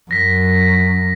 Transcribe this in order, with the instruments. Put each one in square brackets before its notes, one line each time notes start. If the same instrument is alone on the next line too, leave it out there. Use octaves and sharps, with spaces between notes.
[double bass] F#2 [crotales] A#6 B6